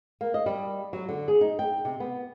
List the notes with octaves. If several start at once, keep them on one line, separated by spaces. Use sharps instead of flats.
A#3
D#5
G3
F#3
D3
G#4
D#4
G5
C3
B3